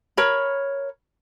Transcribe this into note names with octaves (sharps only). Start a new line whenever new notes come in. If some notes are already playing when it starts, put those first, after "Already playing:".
A#4 C#5 B5